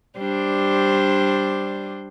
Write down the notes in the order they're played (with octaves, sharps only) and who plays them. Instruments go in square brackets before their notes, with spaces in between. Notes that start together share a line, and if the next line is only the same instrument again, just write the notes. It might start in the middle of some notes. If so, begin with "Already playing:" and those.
[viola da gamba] G3 D4 C5